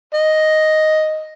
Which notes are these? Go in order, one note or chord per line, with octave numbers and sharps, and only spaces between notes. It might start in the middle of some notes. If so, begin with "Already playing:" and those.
D#5